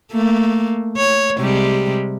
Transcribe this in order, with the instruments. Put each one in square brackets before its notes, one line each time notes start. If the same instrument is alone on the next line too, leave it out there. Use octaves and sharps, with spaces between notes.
[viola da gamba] A3 A#3
C#5
C3 G3 G#3